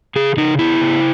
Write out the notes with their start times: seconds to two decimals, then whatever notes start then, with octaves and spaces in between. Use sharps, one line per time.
0.16 C#3 G#4
0.37 C#3 D#4
0.59 B3 E4
0.81 C#3